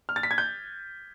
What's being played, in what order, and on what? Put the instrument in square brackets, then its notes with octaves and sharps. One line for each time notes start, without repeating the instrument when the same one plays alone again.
[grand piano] F6
A6
B6
G#6
G6